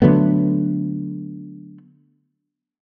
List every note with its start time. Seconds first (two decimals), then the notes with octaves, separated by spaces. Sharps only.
0.02 D3 F#3 A3 B3